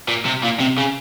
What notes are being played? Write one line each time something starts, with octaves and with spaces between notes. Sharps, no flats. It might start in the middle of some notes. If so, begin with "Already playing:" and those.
A#2
C3
A#2
C3
C#3